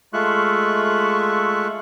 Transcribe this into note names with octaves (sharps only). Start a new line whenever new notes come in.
G#3 A3 F4 E5 C#6 F#6